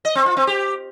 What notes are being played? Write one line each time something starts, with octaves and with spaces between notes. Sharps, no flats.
D#5
C4
F4
C4
G4